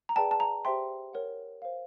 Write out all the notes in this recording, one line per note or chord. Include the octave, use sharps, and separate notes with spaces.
A#5
G#4 B4 D5 G5 A5
A5
A#5
G4 C5 E5 G5 C6
A#4 C#5 F#5
C5 F5